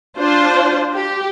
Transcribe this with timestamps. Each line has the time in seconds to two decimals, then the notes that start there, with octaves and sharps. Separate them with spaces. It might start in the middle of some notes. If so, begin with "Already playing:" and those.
0.16 D4 F4 C5
0.93 G4